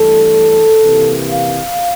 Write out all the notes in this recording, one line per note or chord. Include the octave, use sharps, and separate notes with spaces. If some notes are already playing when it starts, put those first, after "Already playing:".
Already playing: G2 E3 A3 D4 A4
C3 E3 A#3
F5